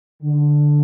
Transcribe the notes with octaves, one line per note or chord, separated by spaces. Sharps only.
D3